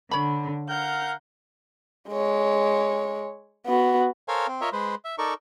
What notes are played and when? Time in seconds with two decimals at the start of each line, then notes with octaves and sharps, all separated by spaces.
0.11 D3 C#5 B5
0.68 A#4 F5 F#5 G6
2.10 G#3 C#5
3.67 B3 F#4
4.28 A4 A#4 C5 C#5 F5 G#5
4.47 C4
4.61 F4 A#4 C#5 D#5 E5
4.73 G#3 B4 C5
5.05 E5
5.18 D#4 A4 A#4 D5 C#6